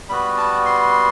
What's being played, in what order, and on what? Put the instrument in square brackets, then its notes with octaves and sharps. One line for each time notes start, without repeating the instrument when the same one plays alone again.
[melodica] G3 B3 F#4 B5
A5
C6